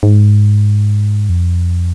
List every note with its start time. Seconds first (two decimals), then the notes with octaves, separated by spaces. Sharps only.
0.03 G#2
1.29 F2